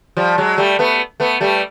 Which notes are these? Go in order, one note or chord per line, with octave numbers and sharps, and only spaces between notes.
F3 G3
F#3 G#3
G3 A3
A3 B3
A3 B3
G3 A3